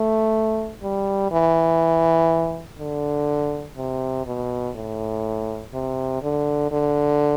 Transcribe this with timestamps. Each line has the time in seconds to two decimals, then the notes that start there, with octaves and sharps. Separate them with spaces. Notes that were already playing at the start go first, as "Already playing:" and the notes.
Already playing: A3
0.83 G3
1.31 E3
2.79 D3
3.77 C3
4.26 B2
4.76 A2
5.74 C3
6.23 D3
6.72 D3